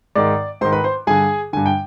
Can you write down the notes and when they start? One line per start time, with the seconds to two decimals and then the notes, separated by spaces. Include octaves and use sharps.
0.15 G#2 D#3 D5 D6
0.61 G#2 C5 C6
0.65 D#3
0.72 B4 B5
0.84 C5 C6
1.07 G2 D3 G#4 G#5
1.53 G2 D3 G#5
1.66 G5